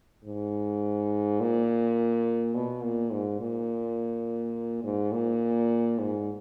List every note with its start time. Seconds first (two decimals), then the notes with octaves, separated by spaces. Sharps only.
0.25 G#2
1.41 A#2
2.55 B2
2.83 A#2
3.12 G#2
3.40 A#2
4.84 G#2
5.12 A#2
5.99 G#2